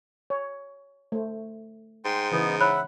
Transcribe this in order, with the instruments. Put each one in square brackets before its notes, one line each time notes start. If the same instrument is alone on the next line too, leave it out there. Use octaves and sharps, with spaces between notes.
[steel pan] C#5
A3 C5
[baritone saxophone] G#2 [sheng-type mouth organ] G5 C6
[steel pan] C#3 E3 B4 [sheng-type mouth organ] B3 D#4
[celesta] C#5 B5 F#6 [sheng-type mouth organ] E5 F#5